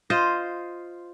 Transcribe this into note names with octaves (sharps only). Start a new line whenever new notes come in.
F4 C5 D#5